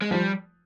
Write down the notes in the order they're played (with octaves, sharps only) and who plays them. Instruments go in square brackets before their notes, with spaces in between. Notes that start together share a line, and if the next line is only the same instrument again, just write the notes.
[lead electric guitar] G#3
[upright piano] F3 [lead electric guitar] G3